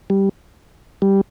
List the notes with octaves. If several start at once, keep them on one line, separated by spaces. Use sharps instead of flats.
G3
G3